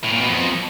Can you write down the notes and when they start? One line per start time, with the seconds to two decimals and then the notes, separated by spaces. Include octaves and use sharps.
0.04 A2
0.12 A#2
0.21 B2
0.29 F2